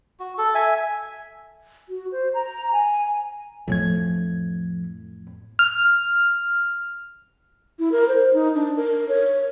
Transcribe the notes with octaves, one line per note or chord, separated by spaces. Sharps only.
F#4
A4
E5 G#5
F#4
C5
A#5
G#5
F2 A2 E3 F3 G#6
F6
E4
A#4
C5
D#4
D4
A#4
C#5